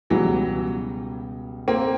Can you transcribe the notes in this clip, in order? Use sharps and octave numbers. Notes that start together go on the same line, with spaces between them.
C#2 B2 E3 F#3 G3
A#3 C4